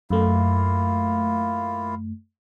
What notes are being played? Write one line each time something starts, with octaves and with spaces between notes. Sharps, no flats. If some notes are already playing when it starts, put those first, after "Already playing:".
F#2 A3 A#3 E4 F4